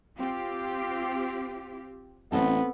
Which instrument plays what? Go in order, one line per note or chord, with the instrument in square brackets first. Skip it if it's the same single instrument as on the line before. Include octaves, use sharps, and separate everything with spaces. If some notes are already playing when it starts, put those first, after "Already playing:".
[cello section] C4 F4 G4
[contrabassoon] A1 [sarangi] B3 [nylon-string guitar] C4 A4